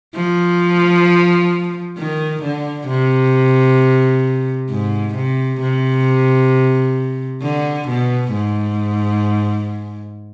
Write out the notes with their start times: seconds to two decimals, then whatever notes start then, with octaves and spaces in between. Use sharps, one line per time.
0.15 F3
1.98 D#3
2.43 D3
2.88 C3
4.70 G#2
5.15 C3
5.61 C3
7.42 D3
7.89 B2
8.33 G#2